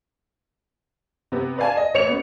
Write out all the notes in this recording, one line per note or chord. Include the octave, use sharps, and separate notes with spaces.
C3 B3
B4 D5 F5 G#5 A5
D#5
A1 C#5 C#7 F7
B3 C#4